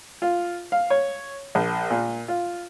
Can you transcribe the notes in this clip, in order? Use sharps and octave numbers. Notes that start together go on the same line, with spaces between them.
F4
F5
C#5
A#1
A#2
F4